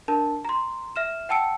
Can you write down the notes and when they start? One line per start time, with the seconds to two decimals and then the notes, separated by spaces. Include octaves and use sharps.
0.08 D4 A#4 A5
0.45 A#5 C6
0.96 E5 F6 E7
1.29 F#5 G5 A5 E6 C#7 D7